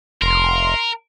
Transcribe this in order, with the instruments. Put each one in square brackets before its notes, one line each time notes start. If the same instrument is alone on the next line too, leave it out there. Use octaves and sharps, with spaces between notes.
[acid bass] F1 [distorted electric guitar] A#4 [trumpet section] C6